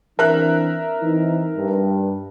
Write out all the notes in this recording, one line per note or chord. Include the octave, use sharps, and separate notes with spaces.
E3 C4 D4 A#4 E5 F#6
E3 C4 D#4
G2